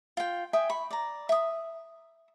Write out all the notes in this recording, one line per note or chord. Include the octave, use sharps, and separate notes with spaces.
F4 G5
E5 G5 G#5 D#6
B5 C#6
D5 A#5
E5 D#6